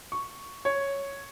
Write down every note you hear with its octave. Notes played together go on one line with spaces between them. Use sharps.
C#6
C#5